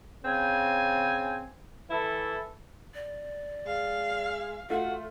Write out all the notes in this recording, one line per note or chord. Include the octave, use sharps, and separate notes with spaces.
C#3 C4 G#5
E3 E4 A4
D5
G#3 F5
A3 F4 F#4 F5